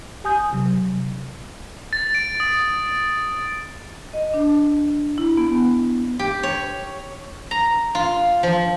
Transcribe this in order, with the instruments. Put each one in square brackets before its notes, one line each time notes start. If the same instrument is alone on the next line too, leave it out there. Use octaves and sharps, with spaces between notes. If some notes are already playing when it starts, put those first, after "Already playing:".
[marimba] G4 G#5 D#6 G6
C3 F#3
[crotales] A6
D7
D#6
[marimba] D#5
D4
E4
B3
[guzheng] G4
C#5
A#5
F4
F3